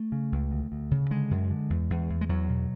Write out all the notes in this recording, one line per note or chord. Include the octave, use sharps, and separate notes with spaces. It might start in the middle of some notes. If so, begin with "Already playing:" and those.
Already playing: A3
C#3
C#2
D2
D2
C#3
D3 G#3
F#2
D3
E2
E2
E2
G#3
E2 F#3
B2